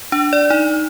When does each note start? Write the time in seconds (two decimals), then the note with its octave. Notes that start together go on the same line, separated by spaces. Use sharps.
0.12 D4
0.33 D5
0.50 D#4